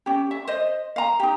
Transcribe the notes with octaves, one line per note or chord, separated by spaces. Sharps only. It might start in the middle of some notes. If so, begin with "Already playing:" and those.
C#4 G4
E5
C5 D#5
F5 A#5
D#4 G4